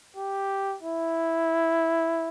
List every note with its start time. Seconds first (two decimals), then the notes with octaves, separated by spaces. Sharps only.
0.17 G4
0.83 E4